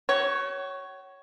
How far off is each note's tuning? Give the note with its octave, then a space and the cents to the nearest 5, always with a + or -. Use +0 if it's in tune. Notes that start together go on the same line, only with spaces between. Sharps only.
F#4 +40 C#5 +0